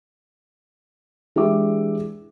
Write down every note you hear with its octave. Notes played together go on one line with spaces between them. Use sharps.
E3 G#3 D4 G4 E5 D6